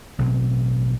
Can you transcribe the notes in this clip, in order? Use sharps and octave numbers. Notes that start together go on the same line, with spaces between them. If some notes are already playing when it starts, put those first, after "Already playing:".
A1 B2 F#3 C4